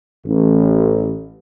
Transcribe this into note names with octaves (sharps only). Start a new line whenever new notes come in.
A1